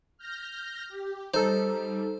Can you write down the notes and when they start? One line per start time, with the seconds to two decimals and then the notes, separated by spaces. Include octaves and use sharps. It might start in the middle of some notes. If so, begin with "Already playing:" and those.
0.18 F6 G6 A#6
0.89 G4
1.34 G3 D#4 A4 C5